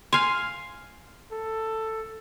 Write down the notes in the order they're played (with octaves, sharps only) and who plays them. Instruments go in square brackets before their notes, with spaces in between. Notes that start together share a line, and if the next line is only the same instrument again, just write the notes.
[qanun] F5 G#5 [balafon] C6
[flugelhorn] A4